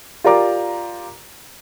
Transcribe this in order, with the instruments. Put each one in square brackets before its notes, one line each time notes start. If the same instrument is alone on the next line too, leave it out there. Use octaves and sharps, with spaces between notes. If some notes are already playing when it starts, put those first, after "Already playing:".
[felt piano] F4 G4 A#4 D5 A#5 D6